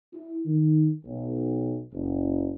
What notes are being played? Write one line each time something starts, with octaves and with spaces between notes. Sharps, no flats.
E4
D#3
B1
F#1